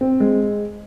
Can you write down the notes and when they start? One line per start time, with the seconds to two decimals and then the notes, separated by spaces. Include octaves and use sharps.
0.01 C4
0.20 G#3